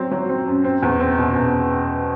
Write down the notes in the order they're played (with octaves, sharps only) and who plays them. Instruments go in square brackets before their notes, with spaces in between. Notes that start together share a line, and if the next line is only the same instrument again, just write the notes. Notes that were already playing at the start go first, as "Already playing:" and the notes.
Already playing: [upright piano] F#3 C4
F#3
C4
F#2
C4
E2
C4
B2
E2